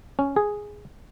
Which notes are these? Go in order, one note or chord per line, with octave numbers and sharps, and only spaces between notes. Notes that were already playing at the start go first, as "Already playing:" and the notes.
C#4
G#4